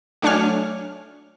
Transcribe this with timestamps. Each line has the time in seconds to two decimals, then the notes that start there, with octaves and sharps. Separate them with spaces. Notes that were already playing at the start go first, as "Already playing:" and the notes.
0.22 F#3 A3 D4 C#5 G#5 F6